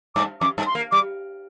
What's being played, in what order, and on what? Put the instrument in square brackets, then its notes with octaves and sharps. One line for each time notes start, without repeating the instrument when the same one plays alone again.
[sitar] G2 [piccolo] D6
[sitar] F2 [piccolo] D6
[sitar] G2
[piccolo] C6
[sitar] A#3
[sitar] G3 [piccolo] D6